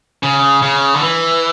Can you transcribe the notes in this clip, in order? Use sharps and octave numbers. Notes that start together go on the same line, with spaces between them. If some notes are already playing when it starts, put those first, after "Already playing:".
C#3
C#3
D3
E3